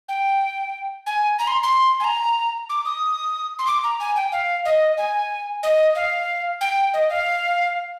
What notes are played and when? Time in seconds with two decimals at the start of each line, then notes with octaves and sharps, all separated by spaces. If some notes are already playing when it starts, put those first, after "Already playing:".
0.09 G5
1.06 G#5
1.39 A#5
1.47 C6
1.63 C6
2.00 G#5
2.04 A#5
2.69 D6
2.85 D#6
3.59 C6
3.67 D6
3.84 A#5
4.00 G#5
4.16 G5
4.32 F5
4.65 D#5
4.98 G#5
5.63 D#5
5.95 F5
6.61 G5
6.94 D#5
7.10 F5